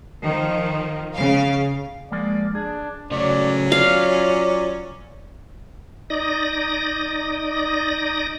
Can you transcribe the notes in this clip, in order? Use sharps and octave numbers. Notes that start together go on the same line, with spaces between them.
D#3 F3
C#3 F5
F3 G#3 A#3 D5
D4 G#4
C#3 F#3 A3 C#4 D5
F4 D5 F5
D#4 D5 D#6 A#6